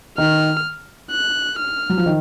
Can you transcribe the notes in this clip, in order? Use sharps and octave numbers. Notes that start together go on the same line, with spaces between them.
D#3 F6
F#6
F6
F#3
F3
D#3